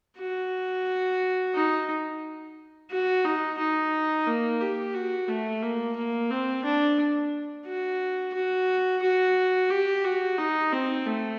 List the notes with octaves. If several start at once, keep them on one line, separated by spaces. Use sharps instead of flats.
F#4
D#4
F#4
D#4
D#4
A#3
G4
F#4
A3
A#3
A#3
C4
D4
F#4
F#4
F#4
G4
F#4
D#4
C4
A3